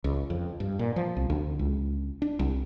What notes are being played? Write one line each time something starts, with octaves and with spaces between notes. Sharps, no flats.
C#2
F2
G2
A#2
F3
C2
D2
C#2
D4
C2